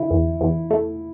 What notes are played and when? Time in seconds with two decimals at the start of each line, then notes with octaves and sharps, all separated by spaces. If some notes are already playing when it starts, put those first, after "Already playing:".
Already playing: D3 E4
0.11 E2
0.41 E2
0.71 A3